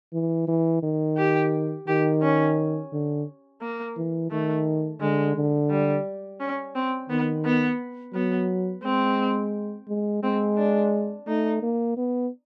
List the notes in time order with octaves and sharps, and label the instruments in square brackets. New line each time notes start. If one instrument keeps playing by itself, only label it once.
[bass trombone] E3
E3
D#3
[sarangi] G4
[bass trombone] D#3 [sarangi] G4
[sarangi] C#4
[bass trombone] D3
[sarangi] A#3
[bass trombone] E3
[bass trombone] D#3 [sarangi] A3
[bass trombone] D3 [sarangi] G#3
[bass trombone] D3
[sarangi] G3
C#4
C4
[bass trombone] D#3 [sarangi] B3
[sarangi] B3
[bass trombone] F#3 [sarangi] B3
[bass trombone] G#3 [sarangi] C4
[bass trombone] G#3
[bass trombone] G#3 [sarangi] C4
[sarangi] D4
[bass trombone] A3 [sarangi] D#4
[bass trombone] A#3
B3